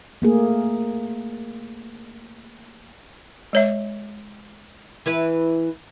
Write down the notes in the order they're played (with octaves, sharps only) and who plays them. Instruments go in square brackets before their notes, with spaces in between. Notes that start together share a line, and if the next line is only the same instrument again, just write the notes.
[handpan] A3 A#3 G#4
[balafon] G#3 C#5 E5
[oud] E3 E4 B4